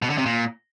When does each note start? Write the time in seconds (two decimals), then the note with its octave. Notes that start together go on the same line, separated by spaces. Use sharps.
0.02 B2
0.10 D3
0.18 C3
0.26 A#2